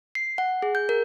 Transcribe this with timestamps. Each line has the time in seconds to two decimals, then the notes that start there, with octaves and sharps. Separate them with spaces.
0.15 C7
0.38 F#5
0.62 G#4
0.75 G6
0.89 A#4